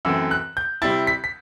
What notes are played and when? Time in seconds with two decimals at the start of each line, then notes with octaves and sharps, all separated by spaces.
0.05 F#2 E3 A3 C4 E6
0.31 F#6
0.57 G6
0.82 C3 G3 C4 E4 A6
1.07 B6
1.24 B6